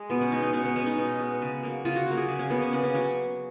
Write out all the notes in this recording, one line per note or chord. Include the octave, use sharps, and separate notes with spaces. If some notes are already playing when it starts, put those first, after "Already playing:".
Already playing: G#3
B2 B3
C#4
G#3 B3 D#4
D#4
B2 C#4
B3
G#3 B3 C#4
D#4
B2
G#3 B3
C#3
F#3 A#3
C#3 F4
F#4
F#3 A#3
G#4
C#3
C#4
F#3 A#3 B3
C#4
C#3 C#4
C#4
F#3 C#4